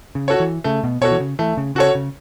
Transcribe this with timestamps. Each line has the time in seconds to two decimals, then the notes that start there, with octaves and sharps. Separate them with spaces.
0.15 C#3
0.28 F#4 A4 C#5
0.40 E3
0.64 C#3 A3
0.84 B2
1.01 B2 F#4 A4 C#5
1.11 E3
1.20 C#3
1.39 E3 A3
1.57 C#3
1.75 C#3 F#4 A4 C#5
1.95 C#3